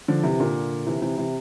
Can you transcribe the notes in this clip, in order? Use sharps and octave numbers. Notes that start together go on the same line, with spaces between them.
D3 F3
C3 E3
A#2 D3
C3 E3
C3 E3
C3 E3